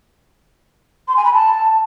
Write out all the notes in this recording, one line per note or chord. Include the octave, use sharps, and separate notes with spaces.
C6
G#5
B5
A5